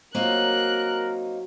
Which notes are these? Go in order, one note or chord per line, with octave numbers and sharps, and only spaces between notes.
F#3 A#3 C4 D#4 A#4 F#6